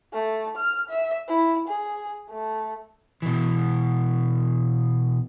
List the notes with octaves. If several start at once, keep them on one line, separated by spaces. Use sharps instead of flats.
A3
F6
E5
E4
G#4
A3
B2 E3